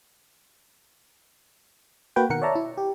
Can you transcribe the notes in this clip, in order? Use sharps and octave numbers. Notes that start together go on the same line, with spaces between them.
A#3 F#4 B4 G5
B2 D#3 A#4 F#5 C#7
C#5 D5 E5 A5 A#5
E4
G4